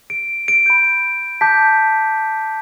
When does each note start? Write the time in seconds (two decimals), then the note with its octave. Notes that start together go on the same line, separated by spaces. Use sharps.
0.10 D7
0.48 D7
0.66 B5 G6
1.41 A5 D6 G6 B6